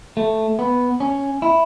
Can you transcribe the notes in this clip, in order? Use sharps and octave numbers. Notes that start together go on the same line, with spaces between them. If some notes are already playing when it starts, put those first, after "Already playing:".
A3
B3
C#4
E4